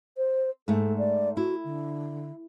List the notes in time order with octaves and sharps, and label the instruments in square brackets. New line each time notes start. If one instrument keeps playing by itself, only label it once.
[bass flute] C5
[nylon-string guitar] G#2 A3 [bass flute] A4
[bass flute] D5
[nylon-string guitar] E4 [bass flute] F#4
[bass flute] D3